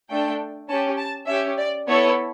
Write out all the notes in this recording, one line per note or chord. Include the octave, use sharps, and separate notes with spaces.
A3 D4 A4 G5
C#4 G4 A5
A5
C#4 G4 E5
D5
B3 E4 A4 C#5